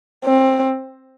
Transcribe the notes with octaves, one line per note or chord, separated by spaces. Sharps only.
C4